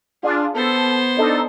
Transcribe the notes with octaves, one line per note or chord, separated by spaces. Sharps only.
D4 F4 G#4
B3 A4 C5
D4 D#4 A4